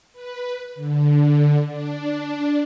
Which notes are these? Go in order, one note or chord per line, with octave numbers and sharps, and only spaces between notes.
B4
D3
D4